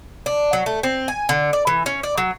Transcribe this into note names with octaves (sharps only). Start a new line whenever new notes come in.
D4
F#3
A3
C4
G#5
D3
D5
E3
C#4
D5
F#3